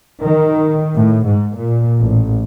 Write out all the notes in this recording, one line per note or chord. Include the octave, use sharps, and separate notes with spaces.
D#3
A2
G#2
A#2
A1